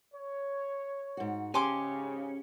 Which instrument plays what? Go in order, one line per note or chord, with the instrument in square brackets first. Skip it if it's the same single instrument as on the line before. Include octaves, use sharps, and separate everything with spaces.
[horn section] C#5
[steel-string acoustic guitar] G#2 F#4
[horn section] G#2 C#3 [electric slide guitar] C#4 [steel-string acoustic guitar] G4 [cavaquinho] G#5 C6 D6